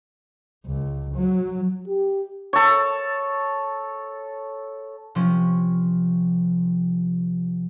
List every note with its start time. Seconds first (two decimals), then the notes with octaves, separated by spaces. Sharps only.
0.66 C#2
1.15 F#3
1.88 G4
2.53 A4 C#5
5.15 C3 F3 C#4